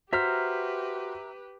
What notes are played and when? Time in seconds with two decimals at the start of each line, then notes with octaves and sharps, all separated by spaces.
0.13 F#4 G4 B4 C5 E5 A#5 F6 B6